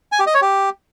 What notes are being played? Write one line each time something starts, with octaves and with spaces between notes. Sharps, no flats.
G#5
G4
D#5
C#5
G4